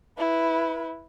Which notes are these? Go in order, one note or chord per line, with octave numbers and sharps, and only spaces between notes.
E4 B4